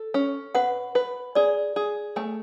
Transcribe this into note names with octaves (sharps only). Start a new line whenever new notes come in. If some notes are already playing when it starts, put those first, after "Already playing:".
Already playing: A4
C#4
B4 F#5
B4
G#4 D5
G#4
A3 G#5